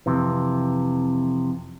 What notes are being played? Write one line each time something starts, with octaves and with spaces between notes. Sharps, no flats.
F2 C3 E3